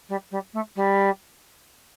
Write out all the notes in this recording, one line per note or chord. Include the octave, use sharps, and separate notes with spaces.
G3
G3
A3
G3